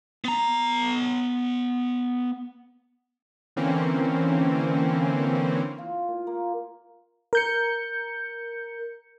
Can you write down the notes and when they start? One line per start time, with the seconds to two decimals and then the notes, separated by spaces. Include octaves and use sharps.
0.24 B3 A#5
3.56 D3 E3 A#3 C4 C#4
5.78 F4
6.08 A#2
6.27 A#3
7.33 A#4 G6 C#7